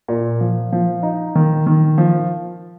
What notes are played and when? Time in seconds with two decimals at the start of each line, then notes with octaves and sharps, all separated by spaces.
0.08 A#2
0.41 F3
0.72 F3
1.03 D#4
1.35 D#3
1.67 D#3
1.98 F3